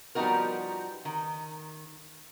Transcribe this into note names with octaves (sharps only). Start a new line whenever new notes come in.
F3 G3 B3 D#4 F#4 A#4
D#3